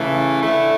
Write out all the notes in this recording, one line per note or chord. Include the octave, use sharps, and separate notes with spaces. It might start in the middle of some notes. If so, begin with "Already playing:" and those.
Already playing: C#3 E3 A3
D3 A3 E4